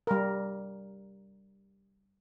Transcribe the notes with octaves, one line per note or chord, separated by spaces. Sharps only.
G3 A#4